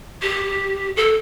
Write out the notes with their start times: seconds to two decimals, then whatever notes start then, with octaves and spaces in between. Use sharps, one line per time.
0.22 G4
0.96 A4